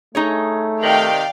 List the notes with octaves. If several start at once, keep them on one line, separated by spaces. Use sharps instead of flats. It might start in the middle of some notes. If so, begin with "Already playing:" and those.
A3 D#4 G#4 C#5
C3 D#3 D5 F5 G5